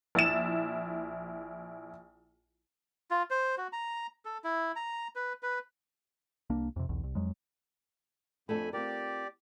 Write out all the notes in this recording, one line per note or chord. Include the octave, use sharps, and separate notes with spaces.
A#1 E4 A6 E7
F4
C5
F#4
A#5
A4
E4
A#5
B4
B4
C2 A#3 D4
F2 C3
B1 E2
C2
F2 F#3 G#3
F2 A3 D4 A4 G#5 B5
C4 F4 G4 A#4 D5